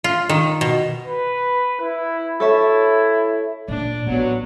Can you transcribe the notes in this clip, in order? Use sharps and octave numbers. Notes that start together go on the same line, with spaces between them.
F4
D#3
B2
B4
E4
E4 A4 C#5 E5
A#2 D4
A1 F#3 B3